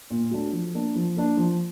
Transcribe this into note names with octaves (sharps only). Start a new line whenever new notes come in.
A#2
F#3 A3 D4
F3
A#3 D4
F3
A#3 D4
F3